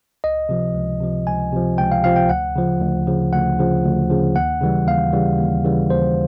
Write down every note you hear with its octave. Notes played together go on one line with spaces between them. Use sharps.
C#2 D#5
C3 F3
C#2
C3 F3
C#2 G#5
C3 F3
C#2 G5
F5
C3 F3 F5
G5
D2 F#5
C#3 F3
D2
C#3 F3
D2 F#5
C#3 F3
D2
C#3 F3
D#2 F#5
C#3 E3 G3
D#2 F5
C#3 E3 G3
D#2
C#3 E3 G3
D#2 C5